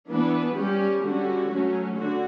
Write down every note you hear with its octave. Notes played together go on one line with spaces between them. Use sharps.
E3 B3 D4 B4
G3 C#4 G4
D3 G3 C#4 F#4
F#3 A3 C#4
D3 F#4